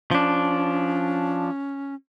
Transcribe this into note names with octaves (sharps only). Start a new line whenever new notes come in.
F3 C#4 D4